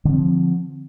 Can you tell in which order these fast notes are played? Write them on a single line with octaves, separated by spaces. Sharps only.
D3 C4 F3